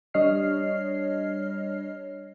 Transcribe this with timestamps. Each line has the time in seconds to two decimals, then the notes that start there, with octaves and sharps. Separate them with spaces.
0.14 G3 D4 C#5 D#5 F6 C7